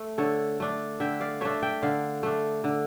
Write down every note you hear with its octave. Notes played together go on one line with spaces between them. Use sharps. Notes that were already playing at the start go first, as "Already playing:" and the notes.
Already playing: A3
D3 A4 C#5
A3 D4
D3 E5 G5
D5 F5
A3 D4 C#5 E5
E5 G5
D3 D5 F5
A3 D4
D3